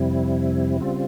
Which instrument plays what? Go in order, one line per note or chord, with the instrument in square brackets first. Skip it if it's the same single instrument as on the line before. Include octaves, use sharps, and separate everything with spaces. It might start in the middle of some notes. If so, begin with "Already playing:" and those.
Already playing: [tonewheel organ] F2 C3 G3 C4 E4
C#3 G3 C4 F4